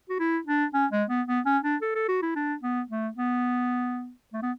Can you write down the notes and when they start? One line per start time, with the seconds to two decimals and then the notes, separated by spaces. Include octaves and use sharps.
0.09 F#4
0.19 E4
0.47 D4
0.74 C#4
0.91 G#3
1.09 B3
1.28 B3
1.46 C#4
1.64 D4
1.82 A4
1.95 A4
2.08 F#4
2.22 E4
2.36 D4
2.63 B3
2.90 A3
3.17 B3
4.33 A3
4.42 B3